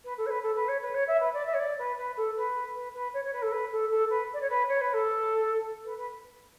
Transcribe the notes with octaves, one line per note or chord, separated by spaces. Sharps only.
B4
A4
C#5
B4
A4
B4
C#5
B4
C#5
E5
B4
D5
E5
C#5
D5
B4
B4
A4
B4
B4
B4
C#5
C#5
B4
A4
B4
A4
A4
B4
D5
C#5
B4
C#5
B4
A4
B4
B4